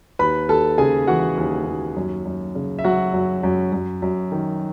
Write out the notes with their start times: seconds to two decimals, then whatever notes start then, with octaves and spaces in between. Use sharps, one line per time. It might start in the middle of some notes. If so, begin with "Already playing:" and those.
0.19 D#2 B4 B5
0.49 D#2 A4 A5
0.78 C#3 G#4 G#5
1.07 E3 F#4 F#5
1.37 D#2
1.67 D#2
1.96 F#2
2.25 F#2
2.55 C#3
2.79 E5
2.84 F#3 F#4 F#5
3.14 F#2
3.43 F#2
3.72 F#2
4.02 F#2
4.32 D#3